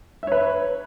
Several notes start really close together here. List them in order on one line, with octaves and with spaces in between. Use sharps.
E5 C#5 B4